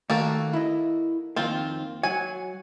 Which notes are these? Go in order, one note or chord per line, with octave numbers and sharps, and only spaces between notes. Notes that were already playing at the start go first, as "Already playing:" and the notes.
D#3 A3 A#3 F#4 A4
E4 D#5
F2 D#3 A#3 C4 F4
F#3 F#4 G#5